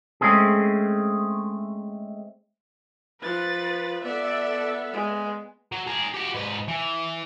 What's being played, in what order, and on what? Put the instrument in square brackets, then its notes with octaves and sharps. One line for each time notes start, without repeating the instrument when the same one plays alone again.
[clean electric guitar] G#3 A3 C4 C#4 G#4
[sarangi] F3 [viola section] B4 [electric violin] A6
[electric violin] B3 [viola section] A4 E5 [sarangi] D5
[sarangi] G#3
[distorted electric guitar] F#3
G#4 A#4
F#4 G4
G#2 B4
E3